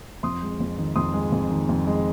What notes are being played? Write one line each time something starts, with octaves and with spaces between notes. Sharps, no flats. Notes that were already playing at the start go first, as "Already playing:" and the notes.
F2 C6 D#6
G#3
F2
D#3
F2 C6 D#6
G#3
F2
D#3
F2
G#3